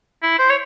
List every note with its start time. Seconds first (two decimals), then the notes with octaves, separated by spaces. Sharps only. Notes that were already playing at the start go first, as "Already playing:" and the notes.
0.23 E4
0.39 C5
0.49 C#5